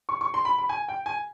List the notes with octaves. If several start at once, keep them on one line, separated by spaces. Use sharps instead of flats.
C#6
C#6
C6
B5
B5
G#5
G5
G#5